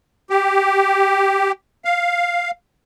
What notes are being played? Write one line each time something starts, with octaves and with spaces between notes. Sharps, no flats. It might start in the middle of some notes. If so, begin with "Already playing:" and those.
G4
F5